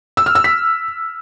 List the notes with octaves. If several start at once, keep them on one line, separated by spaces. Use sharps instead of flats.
E6
F6
E6
B6